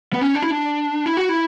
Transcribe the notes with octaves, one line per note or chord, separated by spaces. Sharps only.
B3
C#4
D4
E4
D4
E4
F#4
E4